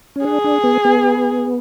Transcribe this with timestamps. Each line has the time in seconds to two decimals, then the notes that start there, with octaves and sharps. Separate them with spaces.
0.16 C#4
0.24 D4 G#4
0.44 D4
0.64 B3
0.85 B3